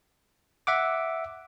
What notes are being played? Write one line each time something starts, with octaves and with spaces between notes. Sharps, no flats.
E5 F#5 D6